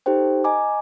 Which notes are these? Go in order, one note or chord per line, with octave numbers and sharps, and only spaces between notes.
D#4 G4 A4 C5 G5
D#5 G#5 A#5 D6